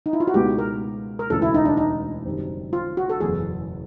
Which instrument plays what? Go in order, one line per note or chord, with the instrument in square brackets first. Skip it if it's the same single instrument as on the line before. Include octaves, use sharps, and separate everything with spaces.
[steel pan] D#4
E4
F4
F#4
[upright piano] C#2 B2 G#3 B3 D#4 [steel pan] G4
[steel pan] A#4
A#4
[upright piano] E1 D2 C#3 E3 A3 [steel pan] A4
[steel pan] E4
D#4
D4
D#4
[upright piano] F#1 F#2 D#3 G3 C4
[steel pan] F4
F#4
A4
[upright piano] F#1 E2 B2 F#3 B3 [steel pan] G#4